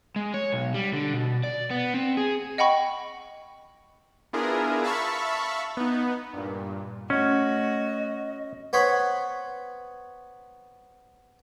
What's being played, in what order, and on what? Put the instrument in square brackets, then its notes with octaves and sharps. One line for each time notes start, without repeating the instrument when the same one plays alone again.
[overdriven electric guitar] G#3
C#5
B1
G3
D3
B2
D5
B3
C4
G#4
[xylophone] D#5 F#5 G5 B5 C#6
[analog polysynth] B3 D4 E4 F4 G#4 A#4
E5 F5 A5 B5 C#6
B3 D#4
G2 A#2
[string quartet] A3 F#4 [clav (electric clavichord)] C#4 [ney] D#5
[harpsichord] B3 C5 C#5 B5